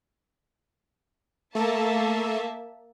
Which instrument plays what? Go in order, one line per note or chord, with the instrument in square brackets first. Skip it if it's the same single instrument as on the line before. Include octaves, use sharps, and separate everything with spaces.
[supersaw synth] A3 A4 [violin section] A#3 E5 A5